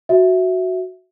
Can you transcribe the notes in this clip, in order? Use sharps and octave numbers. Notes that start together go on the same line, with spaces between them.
F#4 E5